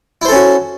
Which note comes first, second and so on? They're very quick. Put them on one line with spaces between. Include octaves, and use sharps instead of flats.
E4 C5 A4 C#4 F#4